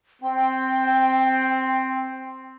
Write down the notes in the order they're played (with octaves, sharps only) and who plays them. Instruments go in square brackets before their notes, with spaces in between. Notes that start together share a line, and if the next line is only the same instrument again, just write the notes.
[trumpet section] C4 [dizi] G5